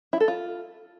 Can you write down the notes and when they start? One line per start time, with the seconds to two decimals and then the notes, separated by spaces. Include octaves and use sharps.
0.13 E4
0.20 A4
0.28 F4